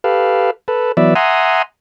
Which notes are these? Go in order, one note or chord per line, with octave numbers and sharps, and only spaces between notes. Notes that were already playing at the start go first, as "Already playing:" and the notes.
G4 A4 B4 F5
A4 B4
E3 F#3 B3 D5 E5
E5 F#5 G#5 A#5 C6 D#6